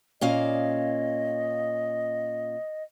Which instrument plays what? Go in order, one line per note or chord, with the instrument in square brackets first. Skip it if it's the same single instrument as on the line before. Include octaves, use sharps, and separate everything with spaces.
[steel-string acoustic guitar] A#2 C#4 F5 [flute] D#5